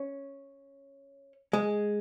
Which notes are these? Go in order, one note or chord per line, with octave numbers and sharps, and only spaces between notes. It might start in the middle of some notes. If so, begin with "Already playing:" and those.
Already playing: C#4
G#3